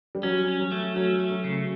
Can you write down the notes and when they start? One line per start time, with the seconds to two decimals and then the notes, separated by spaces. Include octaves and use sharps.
0.15 G3
0.23 F#3 C#4
0.48 C#4
0.60 F#3
0.72 A3
0.96 F#3 C#4
1.19 A3
1.31 F#3
1.44 C#3